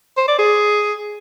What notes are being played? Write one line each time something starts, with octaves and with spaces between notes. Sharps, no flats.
C5
D5
G#4